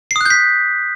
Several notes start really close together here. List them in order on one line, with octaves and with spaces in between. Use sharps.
C7 D#6 F#6 G6 B6